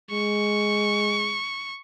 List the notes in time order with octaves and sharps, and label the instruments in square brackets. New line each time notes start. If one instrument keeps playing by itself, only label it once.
[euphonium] G#3 [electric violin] C#6